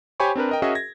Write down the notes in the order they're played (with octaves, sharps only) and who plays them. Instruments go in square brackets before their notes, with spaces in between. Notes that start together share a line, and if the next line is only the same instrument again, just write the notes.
[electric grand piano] G4 C5 C#5 G#5 B5 C#6
C4 D4 A#4 B4
A#4 D#5 G5
C#4 F#4 G#4 A#4 D#5 E5
G#6 A#6